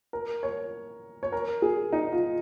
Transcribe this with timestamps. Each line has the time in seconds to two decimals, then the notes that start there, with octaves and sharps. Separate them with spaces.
0.13 A#4
0.43 C#5
1.23 C#5
1.32 A#4
1.62 G#4
1.93 D#4
2.12 F4